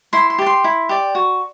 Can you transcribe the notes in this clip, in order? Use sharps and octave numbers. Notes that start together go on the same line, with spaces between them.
E4 C6
C6
G4 D5
C6
E4
G4 D5
F#4